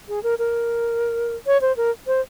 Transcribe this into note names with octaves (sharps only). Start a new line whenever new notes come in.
G#4
A#4
A#4
C#5
C5
A#4
C5